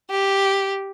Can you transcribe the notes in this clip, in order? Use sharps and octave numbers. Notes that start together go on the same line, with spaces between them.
G4